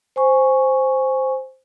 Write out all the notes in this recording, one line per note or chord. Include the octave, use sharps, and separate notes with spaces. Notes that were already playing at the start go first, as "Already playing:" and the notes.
C5 G#5 C#6